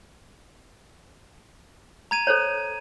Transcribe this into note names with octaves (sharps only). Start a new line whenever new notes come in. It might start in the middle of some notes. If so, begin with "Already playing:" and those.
A#5 G#6 D#7
A4 C5 C#5